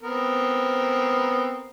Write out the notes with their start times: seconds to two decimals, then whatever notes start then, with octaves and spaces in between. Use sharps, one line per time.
0.03 B3 C4 A#4